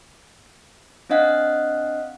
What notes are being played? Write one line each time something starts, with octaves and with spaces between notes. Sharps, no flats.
C4 D4 D#5 F5 F#5 F#6